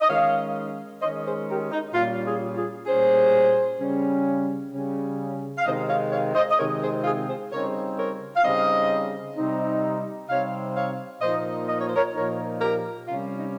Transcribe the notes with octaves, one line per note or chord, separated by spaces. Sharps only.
D#5
D#3 G#3 C#4 C#5 F5
D#3 G#3 C#4 C5 D#5
G#4 C5
G4 A#4
D#4
A#2 G3 C#4 F4
F4 G#4
F4 G#4
A#2 G3 C#4 G#4 C5
C#3 G3 C#4
C#3 G3 C#4
F5
C3 D#3 G#3 C4 D#4 C5 D#5
C#5 F5
C#5 F5
C5 D#5
D#5
C3 D#3 G#3 C4 D#4 A#4 C#5
G#4 C5
F4 G#4
G#4 C5
C#3 G3 C4 D#4 A#4 C#5
A#4 C#5
F5
C#3 G3 C4 D#4 C5 D#5
C3 G3 C4 D#4
C3 G3 C4 D#4 C#5 F5
C#5 F5
A#2 F3 A#3 D#4 C5 D#5
D#5
C#5
C5
A#4 C#5
A#2 F3 A#3 D#4 A#4 C#5
G4 A#4
C3 G3 C#4 F4
D#4